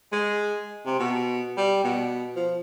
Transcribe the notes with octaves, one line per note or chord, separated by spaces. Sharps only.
G#3
C3
B2
G3
B2
F3